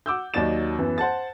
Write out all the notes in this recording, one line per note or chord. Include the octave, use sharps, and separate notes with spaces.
F#5 D6 E6 G6
D#2 F#3 D#4 D5 A6 E7
F#2 E3 B3
C5 F#5 A5 A6